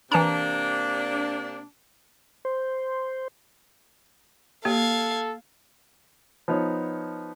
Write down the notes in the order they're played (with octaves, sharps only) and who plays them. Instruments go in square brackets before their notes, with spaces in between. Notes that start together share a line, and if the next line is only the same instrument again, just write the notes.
[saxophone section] C3 A#3 D4 [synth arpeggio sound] E3 A5 A#5
[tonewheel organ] C5
[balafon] A#3 G4 [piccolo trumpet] A4 [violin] F5 G#6
[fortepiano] F3 B3 D#4 C#5